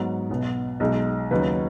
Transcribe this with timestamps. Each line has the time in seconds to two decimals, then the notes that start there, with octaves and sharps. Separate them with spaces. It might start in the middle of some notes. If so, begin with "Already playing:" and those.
Already playing: G#2 F#3 B3
0.29 B1 B2 B3
0.80 B1 B2 G#3 D#4
1.31 D#2 C#3 F#3 D#4 B4